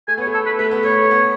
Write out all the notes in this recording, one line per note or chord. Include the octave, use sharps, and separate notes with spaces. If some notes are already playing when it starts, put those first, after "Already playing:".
A3 G#5
B3 C#5
A3
A4
B4
A3 B4
B3
A3 C#5
B3